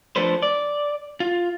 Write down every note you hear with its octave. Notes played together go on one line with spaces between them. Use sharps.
F3 A3 D4 B4 C5
D5
F4